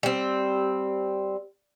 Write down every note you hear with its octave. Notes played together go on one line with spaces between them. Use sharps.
G3 C4